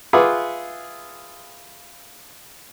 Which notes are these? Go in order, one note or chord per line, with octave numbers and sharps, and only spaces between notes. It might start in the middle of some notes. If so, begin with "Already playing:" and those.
F4 G#4 B4 E5 F#5 D6